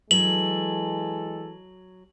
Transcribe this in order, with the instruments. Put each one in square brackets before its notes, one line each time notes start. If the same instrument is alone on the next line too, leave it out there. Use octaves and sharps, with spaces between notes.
[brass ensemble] E3 G#3 A4 [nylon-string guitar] F#3 [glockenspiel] F#7